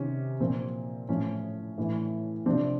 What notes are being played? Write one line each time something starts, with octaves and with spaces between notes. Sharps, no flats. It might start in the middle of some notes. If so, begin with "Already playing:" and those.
Already playing: C3 D#3 C#4
A#2 F3 C4
A2 F3 C#4
A2 E3
C3 F3 C4 D4